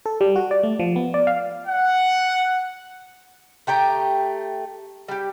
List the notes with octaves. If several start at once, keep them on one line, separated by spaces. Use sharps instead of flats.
A4
G3
F#4
D5
A3
F3
B3
D5
F5
F#5
A3 G4 G5 A#5
G3 G4